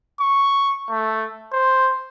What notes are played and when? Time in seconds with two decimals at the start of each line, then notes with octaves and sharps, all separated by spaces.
0.20 C#6
0.90 A3
1.53 C5